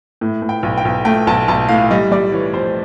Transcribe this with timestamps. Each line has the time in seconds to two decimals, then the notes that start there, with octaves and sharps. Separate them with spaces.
0.21 A2
0.42 A2
0.49 G5
0.63 B1
0.78 G5
0.85 B1
1.05 A3 G5
1.27 B1 A5
1.48 B1 A5
1.69 A2 F5
1.90 G3 D#5
2.12 G3 D5
2.32 E3 C#5
2.53 F2 C5